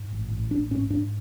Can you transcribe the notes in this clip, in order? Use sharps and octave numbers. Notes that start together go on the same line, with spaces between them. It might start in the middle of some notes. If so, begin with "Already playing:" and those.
Already playing: G#2
A1
A1
A1 D4
G#2 C#4
G#2 D4